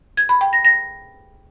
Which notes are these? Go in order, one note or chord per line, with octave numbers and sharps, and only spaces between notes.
G#6
B5
G5
A#6
A#6